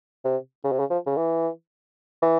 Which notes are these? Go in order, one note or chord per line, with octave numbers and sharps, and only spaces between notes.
C3
C#3
C3
C#3
F3
C#3
E3
E3